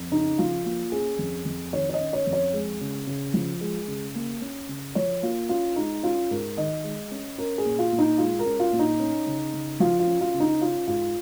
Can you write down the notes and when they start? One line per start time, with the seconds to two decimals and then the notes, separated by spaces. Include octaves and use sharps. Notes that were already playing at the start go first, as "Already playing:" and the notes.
Already playing: F2
0.12 C#3 D#4
0.38 F3 F4
0.65 A#3 F4
0.92 C#4 G#4
1.19 F2
1.45 F2
1.73 D#3 C#5
1.89 C#5
1.94 D#5
2.00 C#4
2.13 C#5
2.27 F2
2.33 C#5
2.53 G#3
2.81 C#3
3.07 C#3
3.34 F3
3.61 G#3
3.88 C#3
4.15 A#3
4.41 C#4
4.69 C#3
4.95 F3 C#5
5.22 A#3 F4
5.49 C#4 F4
5.76 G#3 D#4
6.03 C#4 F4
6.30 G#2 A#4
6.57 D#3 D#5
6.84 G#3
7.11 C#4
7.38 C#4 A#4
7.58 G#4
7.65 A#2
7.79 F4
7.92 A#2
7.98 D#4
8.18 G#3 F4
8.39 A#4
8.45 C#4
8.60 F4
8.73 A#2
8.79 D#4
9.00 C#4
9.26 C#3
9.53 C#3
9.80 F3 F4
10.00 F4
10.07 C#4
10.21 F4
10.34 C#3
10.40 D#4
10.61 C#4 F4
10.87 G#2 F4